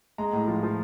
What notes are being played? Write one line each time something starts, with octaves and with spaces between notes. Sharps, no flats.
G#3 A#5
A2
F3
F3